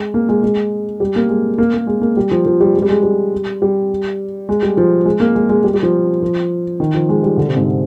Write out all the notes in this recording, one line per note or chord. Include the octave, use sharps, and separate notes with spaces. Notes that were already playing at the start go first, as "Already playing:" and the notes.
Already playing: G#3
A#3
G#3
G#3
G3
A#3
G#3
A#3
A#3
G#3
A#3
G3
F3
F3
G3
G#3
G3
G#3
G3
G3
G#3
G3
F3
G#3
A#3
G#3
G#3
G3
G3
F3
F3
D#3
F3
G#3
G3
D3
C3
G#2